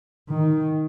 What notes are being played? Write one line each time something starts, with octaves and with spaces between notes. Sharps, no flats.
D#3